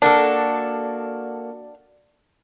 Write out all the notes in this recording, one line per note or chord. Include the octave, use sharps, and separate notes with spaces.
A#3 D4 F#4 A4